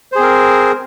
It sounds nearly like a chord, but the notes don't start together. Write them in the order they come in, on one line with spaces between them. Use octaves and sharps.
C5 G#4 C4 A#4